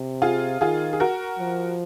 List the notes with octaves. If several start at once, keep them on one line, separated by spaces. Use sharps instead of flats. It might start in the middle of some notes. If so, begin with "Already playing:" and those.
Already playing: C3
F4 G#4
D#3 F4 G#4
G#4
F#4 A#4
F3